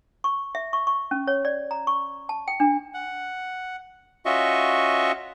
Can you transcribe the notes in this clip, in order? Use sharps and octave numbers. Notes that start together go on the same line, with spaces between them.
C#6
E5
C#6
C#6
C#4
C#5
D5
A#5
C#6
A5
G5
D4
F#5
C#4 F4 F#4 D#5 E5 C#6